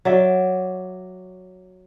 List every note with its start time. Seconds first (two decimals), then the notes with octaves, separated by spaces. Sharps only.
0.05 F#3 D5 E5